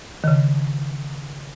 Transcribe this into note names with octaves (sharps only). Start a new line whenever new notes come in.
D#3
C#3